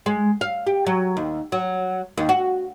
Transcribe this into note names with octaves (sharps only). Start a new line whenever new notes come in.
G#3
F5
G4
F#3
D#2
F#3
D#2
F#4